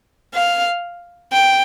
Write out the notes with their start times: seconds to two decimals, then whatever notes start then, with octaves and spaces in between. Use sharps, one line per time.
0.35 F5
1.33 G5